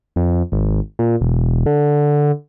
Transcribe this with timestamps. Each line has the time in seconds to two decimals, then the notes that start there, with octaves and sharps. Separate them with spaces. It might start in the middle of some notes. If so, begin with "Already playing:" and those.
0.16 F2
0.52 G#1
0.99 A#2
1.21 E1
1.66 D3